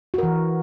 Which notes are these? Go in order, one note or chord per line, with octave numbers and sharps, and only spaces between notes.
E3 F#4 A#4